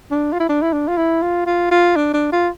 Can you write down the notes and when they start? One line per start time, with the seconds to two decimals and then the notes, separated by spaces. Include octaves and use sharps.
0.11 D4
0.32 F4
0.40 E4
0.49 D4
0.62 E4
0.73 D4
0.88 F4
0.97 E4
1.22 F4
1.46 F4
1.71 F4
1.96 D4
2.14 D4
2.32 F4